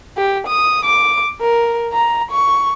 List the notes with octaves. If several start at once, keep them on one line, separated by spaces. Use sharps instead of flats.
G4
D#6
D6
A#4
A#5
C#6